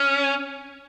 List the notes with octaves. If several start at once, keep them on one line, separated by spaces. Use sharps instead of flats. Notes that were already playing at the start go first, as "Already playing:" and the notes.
Already playing: C#4